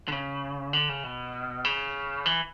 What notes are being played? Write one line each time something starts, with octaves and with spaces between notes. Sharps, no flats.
D3
C#3
D3
C#3
B2
C#3
E3